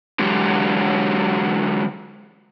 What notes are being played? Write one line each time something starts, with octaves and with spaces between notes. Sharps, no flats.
D3 E3 F#3 G#3 F#4 G4